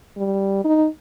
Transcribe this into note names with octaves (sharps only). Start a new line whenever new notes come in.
G3
D#4